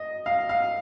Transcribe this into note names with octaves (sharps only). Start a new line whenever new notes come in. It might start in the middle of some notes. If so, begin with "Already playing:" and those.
Already playing: D#5
F5
F5